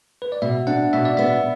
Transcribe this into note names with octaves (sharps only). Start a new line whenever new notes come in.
B4
D5
B2 E5
D4 F#5
B2 E5
D5
B3 E5